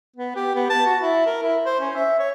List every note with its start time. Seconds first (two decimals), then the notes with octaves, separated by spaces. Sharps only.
0.17 B3
0.36 G4
0.55 B3
0.70 A5
0.86 F#4
1.02 E4
1.26 A#4
1.43 E4
1.66 C5
1.81 C#4
1.95 E5
2.19 C#5